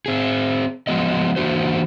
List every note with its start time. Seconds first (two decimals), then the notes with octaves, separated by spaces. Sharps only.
0.06 C4 G#4
0.87 F3 F#3 G#3 B3 D#5
1.36 E3 A#3 D4 F#4 C5